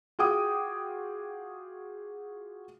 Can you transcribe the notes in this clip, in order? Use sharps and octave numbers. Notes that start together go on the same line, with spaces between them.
F4 F#4 G#4 G5 D6 D#6